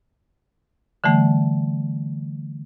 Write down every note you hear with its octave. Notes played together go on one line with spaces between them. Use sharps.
D3 E3 G3 A3